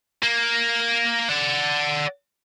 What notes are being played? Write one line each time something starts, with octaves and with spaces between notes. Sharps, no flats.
A#3
D5 F#5